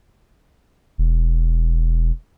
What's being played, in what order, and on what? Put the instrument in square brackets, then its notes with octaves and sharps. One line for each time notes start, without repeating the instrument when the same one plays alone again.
[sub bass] E1